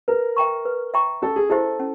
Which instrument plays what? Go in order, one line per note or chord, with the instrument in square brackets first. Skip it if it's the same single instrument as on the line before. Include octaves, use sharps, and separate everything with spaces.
[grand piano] A#4 [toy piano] B4
[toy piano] E5 G5 A#5 C#6
B4
E5 G5 A#5 C#6
[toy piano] C#4 [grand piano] A4
[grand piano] G#4
[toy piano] E4 G4 C5 E5 [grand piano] A4
[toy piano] C#4